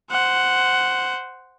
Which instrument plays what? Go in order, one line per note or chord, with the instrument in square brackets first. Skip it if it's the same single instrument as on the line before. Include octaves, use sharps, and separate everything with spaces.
[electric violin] C5 F#5